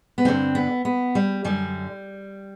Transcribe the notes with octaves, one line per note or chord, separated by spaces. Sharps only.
B3
G2 D3 C4
B3
B3
G3
F#2 D3 G3